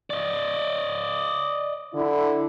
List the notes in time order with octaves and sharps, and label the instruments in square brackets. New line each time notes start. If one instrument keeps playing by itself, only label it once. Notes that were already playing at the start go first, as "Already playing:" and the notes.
[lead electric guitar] D5 D#5
[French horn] D3 [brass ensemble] E4